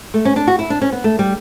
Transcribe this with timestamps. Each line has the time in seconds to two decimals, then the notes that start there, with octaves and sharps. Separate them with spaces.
0.14 A3
0.25 C#4
0.36 D4
0.47 F#4
0.59 E4
0.70 D4
0.81 C#4
0.92 B3
1.04 A3
1.19 G3